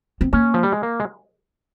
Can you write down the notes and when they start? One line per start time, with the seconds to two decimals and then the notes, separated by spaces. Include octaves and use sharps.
0.21 C4
0.33 A#3 C#4
0.54 F3
0.63 G3
0.72 G#3
0.83 A#3
1.00 G#3